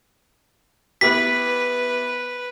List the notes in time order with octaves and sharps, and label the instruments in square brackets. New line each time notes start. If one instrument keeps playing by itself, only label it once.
[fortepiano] B3 E4 G4 [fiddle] B4 [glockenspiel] B6